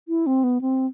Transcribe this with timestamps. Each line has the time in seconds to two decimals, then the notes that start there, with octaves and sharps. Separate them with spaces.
0.08 E4
0.27 C4
0.44 B3
0.61 C4